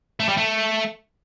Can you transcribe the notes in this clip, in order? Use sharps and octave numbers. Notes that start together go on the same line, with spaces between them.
A3
G3
A3